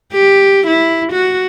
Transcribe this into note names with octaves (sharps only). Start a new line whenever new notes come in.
G4
E4
F#4